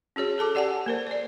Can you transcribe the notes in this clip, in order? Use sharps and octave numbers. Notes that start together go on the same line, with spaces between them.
C#4 F#4 G#4 C#5
G#4 A4 A5 D6
G4 D5 F#5 G#5 A5
A#3 A#4 C5
C5 D5